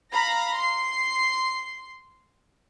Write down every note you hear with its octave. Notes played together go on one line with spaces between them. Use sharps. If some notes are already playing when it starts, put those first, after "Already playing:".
F5 A#5 B5 A#6
C6 C7